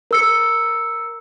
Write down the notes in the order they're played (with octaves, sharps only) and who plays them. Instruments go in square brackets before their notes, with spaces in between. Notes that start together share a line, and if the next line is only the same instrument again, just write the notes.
[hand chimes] A#4 E6 C#7